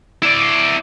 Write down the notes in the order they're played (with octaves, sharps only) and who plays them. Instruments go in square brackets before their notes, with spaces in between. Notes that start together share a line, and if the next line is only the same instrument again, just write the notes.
[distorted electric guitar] E4 D5